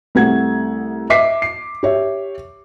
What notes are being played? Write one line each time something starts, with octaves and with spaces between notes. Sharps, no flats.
C2 A3 F#5 G#6
D#5 E5 D6 B6 C7
C7
G4 C#5 E5